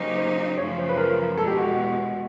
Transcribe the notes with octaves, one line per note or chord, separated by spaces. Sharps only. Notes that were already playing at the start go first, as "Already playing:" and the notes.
Already playing: C#3 F#3 A#3 D#4 G4 C5
C5
F#2 C#3 F3 A3 C#5
C5
B4
A#4
E2 B2 G#3 A4
G4
F#4